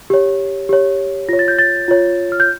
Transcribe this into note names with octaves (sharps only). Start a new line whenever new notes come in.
G4 C#5
G4 C#5
F4 C#5 A#6
A6
G6
A6
F4 C#5
F6
G6